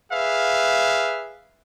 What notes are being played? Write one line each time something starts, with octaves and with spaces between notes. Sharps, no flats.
G#4 B4 E5 F5